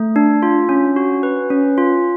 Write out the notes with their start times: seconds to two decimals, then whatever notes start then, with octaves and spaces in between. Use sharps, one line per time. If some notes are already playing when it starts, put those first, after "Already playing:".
Already playing: A3
0.16 D4
0.43 F4
0.69 C#4
0.96 F#4
1.23 B4
1.50 C#4
1.78 F4